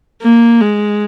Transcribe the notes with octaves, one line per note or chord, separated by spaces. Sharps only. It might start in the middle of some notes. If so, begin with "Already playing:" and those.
A#3
G#3